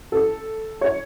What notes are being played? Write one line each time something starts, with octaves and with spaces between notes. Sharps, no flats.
A4
C#5